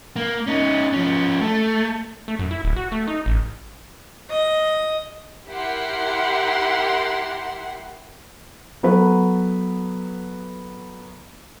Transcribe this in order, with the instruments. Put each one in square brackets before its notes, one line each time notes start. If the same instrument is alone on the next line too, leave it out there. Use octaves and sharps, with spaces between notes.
[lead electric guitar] A#3
C#4 D#4
F3 C#4
A3
[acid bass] A3
F#2
E4
D1
F#4
A3
D#4
A1
[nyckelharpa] D#5
[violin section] E4 G4 A#4 F#5 C6
[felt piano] F#3 B3 A4 B4